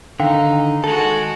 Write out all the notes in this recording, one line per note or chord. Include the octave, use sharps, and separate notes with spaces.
D3 D#3 D#4 F5 G5
G#3 F#4 A4